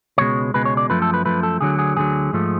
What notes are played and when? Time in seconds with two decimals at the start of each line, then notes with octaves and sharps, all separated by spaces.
0.18 C#2 B2 G#3 C#5
0.54 C#2 B2 G#3 B4
0.65 C#5
0.77 D5
0.90 F#2 F3 A3 B4
1.02 A4
1.14 B4
1.25 F#2 F3 A3 B4
1.43 A4
1.61 D2 D3 F#3 G#4
1.79 G#4
1.96 D2 D3 F#3 G#4
2.33 G#2 F3 A3